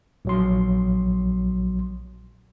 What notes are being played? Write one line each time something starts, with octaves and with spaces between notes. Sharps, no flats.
A#1 F#3 C6